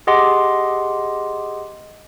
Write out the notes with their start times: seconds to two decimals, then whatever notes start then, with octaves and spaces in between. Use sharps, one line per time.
0.07 G4 G#4 D#5 F#5 C6 D6